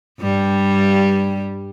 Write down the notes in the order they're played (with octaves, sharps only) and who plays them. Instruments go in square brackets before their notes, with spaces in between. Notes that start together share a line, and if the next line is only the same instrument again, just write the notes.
[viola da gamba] G2 G3